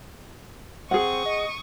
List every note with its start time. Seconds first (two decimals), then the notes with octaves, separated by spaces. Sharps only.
0.91 C4 G#4 F#5 C#6 D#6
1.26 D#5